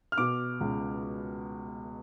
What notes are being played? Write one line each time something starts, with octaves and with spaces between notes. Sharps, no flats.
F6
B2 D6
C#2